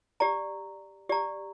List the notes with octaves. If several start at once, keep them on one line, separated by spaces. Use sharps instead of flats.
G4 D5 A#5
G4 D5 A#5